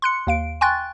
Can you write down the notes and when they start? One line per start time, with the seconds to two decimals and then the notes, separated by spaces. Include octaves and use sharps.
0.02 C6 F#6 C#7
0.27 D#2 F5 D7
0.61 G5 G#5 C6 C#6 F#6 A6